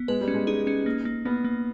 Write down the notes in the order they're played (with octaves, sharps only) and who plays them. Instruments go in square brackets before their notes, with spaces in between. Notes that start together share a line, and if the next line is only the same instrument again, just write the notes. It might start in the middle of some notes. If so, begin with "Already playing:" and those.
Already playing: [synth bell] B3
[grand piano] G#3 [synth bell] B4
[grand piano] G3
[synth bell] C#4
[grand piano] G#3
[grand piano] D#4 [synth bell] G#4
[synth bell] C#4
A#3
A#3
[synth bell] A#3 [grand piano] B3
[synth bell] A#3